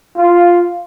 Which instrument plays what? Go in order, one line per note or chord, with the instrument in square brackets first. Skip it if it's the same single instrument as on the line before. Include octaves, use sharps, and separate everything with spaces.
[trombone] F4